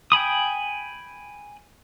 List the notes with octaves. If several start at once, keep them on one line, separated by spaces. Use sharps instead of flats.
G5 G#5 B5 D#6